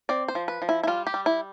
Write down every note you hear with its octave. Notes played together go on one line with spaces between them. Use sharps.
C4 D5
C5
F3
B4
F3
E4
E4
G3 F4
G4
G3
E4